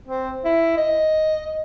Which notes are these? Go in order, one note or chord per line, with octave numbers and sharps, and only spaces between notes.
C4
E4
D#5